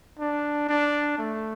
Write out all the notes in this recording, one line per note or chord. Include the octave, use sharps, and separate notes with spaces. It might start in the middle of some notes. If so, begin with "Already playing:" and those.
D4
D4
A3